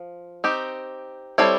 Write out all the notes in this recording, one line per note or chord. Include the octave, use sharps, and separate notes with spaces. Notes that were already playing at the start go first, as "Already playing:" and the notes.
Already playing: F3
C4 D#4 G4
G3 C4 E4 A4 C#5